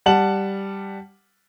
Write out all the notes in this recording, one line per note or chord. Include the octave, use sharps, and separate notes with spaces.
G3 F#5 A5 F#7